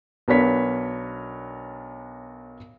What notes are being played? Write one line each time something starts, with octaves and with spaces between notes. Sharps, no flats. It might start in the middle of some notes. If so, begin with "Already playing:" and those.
B1 B3 D4 A#4 C#5 B6